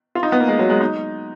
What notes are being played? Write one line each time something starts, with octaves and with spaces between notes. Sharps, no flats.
F4
D#4
B3
A#3
G#3
F#3
G#3
D#4